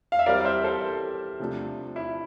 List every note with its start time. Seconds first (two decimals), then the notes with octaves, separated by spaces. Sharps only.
0.12 F5
0.19 E5
0.26 E3 G3 C4 A#4 D5
0.45 C5 E5
0.64 A4 C5
1.39 C3 F3 A3 D4
1.96 E4